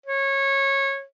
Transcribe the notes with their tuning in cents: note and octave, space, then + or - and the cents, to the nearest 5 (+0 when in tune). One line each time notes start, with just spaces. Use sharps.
C#5 -20